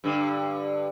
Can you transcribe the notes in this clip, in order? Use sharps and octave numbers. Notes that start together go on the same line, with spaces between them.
G2 D3